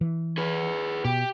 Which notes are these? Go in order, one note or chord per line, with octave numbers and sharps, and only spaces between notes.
E3
G#4 B4
B2 G4